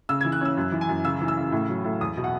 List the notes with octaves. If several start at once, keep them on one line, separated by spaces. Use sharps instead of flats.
C#3 E6
E3 G#6
F#6
C#4 E6
F#2
E3
G#5
F#2
C#3 E6
E3
E6
C#3
A2
F#3
A2
E2 D#6
B2
F#5